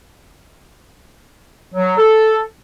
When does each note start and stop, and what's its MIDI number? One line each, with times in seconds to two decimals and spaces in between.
1.74 1.97 54
1.97 2.39 69